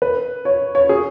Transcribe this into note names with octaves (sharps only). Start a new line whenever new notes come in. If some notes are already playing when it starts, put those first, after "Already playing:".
B4
C#5
C#5
G#4